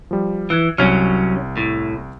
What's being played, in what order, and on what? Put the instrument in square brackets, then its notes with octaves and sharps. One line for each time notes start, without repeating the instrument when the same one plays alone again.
[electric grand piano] F3 G3
[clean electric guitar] E3 [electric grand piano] E6 F#6 G#6
[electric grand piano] C2 C#6 F6 [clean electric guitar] F#3 C#4
[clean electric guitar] A2